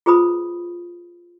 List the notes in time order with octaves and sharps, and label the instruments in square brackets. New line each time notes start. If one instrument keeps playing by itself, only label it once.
[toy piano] F4 G#4 B4 C5 B5 D#6